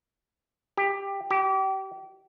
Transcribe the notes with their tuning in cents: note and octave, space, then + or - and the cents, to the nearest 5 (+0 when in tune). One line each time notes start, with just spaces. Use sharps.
G4 +15
G4 -30